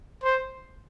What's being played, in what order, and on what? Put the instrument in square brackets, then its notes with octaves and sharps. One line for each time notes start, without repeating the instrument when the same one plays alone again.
[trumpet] C5